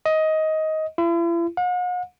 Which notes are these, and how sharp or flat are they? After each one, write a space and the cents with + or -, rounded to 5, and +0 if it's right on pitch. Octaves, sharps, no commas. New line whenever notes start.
D#5 +15
E4 +45
F#5 -45